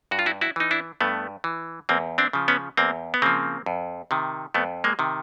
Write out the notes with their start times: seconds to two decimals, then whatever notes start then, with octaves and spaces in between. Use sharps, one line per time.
0.11 G2 F#4
0.19 F4
0.26 E4 F#4
0.41 E4 F#4
0.56 E3 D#4
0.71 D4 E4
1.01 G2 A3 B3
1.44 E3
1.89 E2 A#3 C4
2.18 C4 D4
2.33 C#3 F3
2.48 B3 C#4
2.77 E2 A#3 C4
3.14 B3
3.22 C#3 F3 A#3 C4
3.66 F2
4.11 C3 D#3
4.54 F2 A3 B3
4.84 G#3 A#3
4.99 C3 D#3